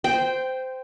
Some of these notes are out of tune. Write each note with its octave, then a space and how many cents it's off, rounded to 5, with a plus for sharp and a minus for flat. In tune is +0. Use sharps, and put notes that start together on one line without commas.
C5 -15 G5 +0